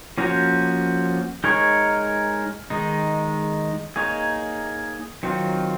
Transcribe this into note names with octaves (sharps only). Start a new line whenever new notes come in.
F3 A#3 C#4 F#4 C5
G#3 D#4 A#4 C#5
D#3 G#3 D#4
A#3 D#4 G#4 C#5
D#3 F#3 C4 F4